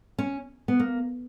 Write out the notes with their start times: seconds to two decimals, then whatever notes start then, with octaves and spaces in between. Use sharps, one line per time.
0.18 C#4
0.68 B3
0.80 A#3